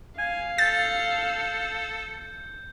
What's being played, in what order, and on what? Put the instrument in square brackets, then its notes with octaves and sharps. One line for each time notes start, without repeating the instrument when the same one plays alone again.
[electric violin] F5 [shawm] G#5
[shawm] A4 [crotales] G6 [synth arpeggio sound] A6